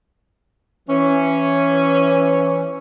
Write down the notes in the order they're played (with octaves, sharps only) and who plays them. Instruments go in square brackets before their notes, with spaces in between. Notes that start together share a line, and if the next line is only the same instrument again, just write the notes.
[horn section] E3 C#4